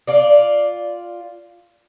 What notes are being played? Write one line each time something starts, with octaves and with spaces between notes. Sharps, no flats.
F4 D5